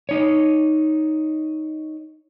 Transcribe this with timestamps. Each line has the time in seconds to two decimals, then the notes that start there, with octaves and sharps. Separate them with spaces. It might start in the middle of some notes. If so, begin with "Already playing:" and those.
0.09 D#4 C#5